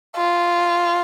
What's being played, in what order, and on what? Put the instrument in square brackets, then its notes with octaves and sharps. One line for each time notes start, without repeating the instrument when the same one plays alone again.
[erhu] F4